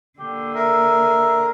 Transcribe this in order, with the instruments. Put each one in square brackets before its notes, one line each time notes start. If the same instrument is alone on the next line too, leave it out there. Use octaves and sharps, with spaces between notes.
[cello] D3 A#3 [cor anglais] G4
[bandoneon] A#4 [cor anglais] E5